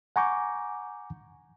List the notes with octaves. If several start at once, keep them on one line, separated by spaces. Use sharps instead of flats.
F#5 G#5 A#5 C#6 D6 G6